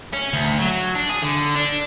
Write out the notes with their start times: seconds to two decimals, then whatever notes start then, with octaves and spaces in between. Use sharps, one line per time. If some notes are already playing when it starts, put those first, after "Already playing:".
0.13 C#4
0.33 D2
0.59 F#3
0.95 D4
1.09 G#4
1.22 D3
1.55 D4